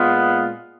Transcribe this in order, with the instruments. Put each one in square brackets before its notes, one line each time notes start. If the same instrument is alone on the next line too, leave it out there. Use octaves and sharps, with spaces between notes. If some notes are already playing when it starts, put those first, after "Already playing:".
Already playing: [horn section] A#2 G#3 B3 F4